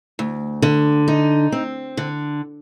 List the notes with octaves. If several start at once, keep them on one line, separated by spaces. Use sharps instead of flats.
D2
D3
D#4
C4
D3